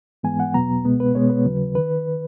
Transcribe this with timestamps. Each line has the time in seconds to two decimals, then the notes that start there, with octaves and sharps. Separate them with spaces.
0.23 G#2 E3 G#3 B3 G#5
0.40 F#5
0.54 E2 B2 F#3 B3 A#5
0.84 C#2 B2 G#3 B3
1.00 B4
1.15 B2 G#3 B3 C#5
1.30 B4
1.45 D#2 C#3 F#3
1.75 D#3 B4